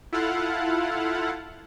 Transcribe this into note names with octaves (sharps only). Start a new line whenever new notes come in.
E4 F4 A4 F5 F#5